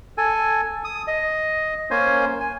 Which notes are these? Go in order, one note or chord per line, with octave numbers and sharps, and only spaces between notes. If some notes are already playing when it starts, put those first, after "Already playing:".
A4 G#5
D#6
D#5
A#3 C#4 C5 G#5
G#5